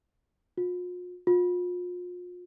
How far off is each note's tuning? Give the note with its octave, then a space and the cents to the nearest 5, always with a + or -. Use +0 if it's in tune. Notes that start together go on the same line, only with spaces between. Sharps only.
F4 +45
F4 +35